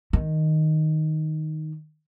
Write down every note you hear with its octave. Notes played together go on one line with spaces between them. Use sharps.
D#3